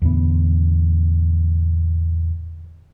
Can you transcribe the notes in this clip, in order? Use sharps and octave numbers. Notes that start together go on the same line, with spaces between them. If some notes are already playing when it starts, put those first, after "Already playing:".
E2 A2 D3 B3